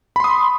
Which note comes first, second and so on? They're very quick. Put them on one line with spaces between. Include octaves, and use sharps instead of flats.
B5 C6 D#6